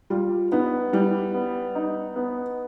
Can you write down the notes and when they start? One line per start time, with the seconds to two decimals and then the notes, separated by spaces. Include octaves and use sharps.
0.10 G3 F4
0.52 B3 D#4
0.93 G3 E4
1.34 B3
1.75 D#4
2.16 B3